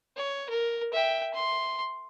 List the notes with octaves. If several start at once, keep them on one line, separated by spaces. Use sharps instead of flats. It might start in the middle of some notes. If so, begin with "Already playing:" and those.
C#5
A#4
E5 G5
C6